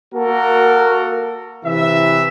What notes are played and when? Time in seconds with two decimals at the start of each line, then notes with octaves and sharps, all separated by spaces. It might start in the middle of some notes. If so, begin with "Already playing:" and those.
0.14 A#3 F#4 A4 A#4
1.64 C3 E3 E5